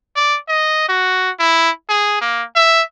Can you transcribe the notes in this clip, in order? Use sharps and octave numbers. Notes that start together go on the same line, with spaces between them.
D5
D#5
F#4
E4
G#4
A#3
E5